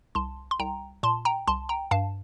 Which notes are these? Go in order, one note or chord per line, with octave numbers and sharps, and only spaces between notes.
C2 A5 C6
C6
C2 G5 A#5
A#2 A5 C6
G5 A#5
C2 A5 C6
G5 A#5
G2 F5 A5